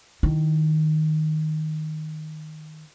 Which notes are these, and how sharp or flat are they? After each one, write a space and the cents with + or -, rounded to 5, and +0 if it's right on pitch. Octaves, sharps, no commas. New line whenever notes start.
D#3 +0 E4 +0